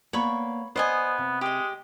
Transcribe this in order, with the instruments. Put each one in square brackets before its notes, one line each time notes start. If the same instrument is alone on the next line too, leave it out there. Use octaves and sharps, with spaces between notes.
[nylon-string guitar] A#3 B3 D5 [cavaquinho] C#5 B5 C#6
[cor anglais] B3 [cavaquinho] C5 D#5 G#5 [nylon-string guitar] D5
[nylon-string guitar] C3
[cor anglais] G#3 [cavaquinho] G4 D#5